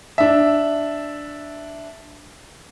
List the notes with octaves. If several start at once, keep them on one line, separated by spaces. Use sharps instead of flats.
D4 E5